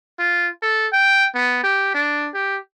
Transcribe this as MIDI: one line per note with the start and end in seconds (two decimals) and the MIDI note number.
0.19 0.48 65
0.62 0.87 69
0.93 1.27 79
1.35 1.64 59
1.64 1.92 67
1.94 2.29 62
2.34 2.58 67